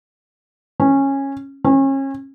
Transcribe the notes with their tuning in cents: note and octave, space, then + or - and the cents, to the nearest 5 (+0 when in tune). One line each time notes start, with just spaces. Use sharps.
C#4 -15
C#4 -35